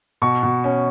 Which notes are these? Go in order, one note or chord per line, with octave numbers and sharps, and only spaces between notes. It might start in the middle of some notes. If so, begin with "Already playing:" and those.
B2 C#6
B2
C#4